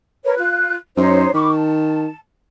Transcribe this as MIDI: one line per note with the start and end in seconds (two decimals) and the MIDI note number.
0.25 0.34 70
0.25 0.34 71
0.25 0.34 73
0.38 0.75 65
0.38 0.75 90
0.97 1.26 42
0.97 1.34 63
0.97 1.34 72
0.97 1.34 73
1.34 2.07 51
1.34 1.51 83
1.34 1.51 85
1.34 1.51 86
1.52 2.17 81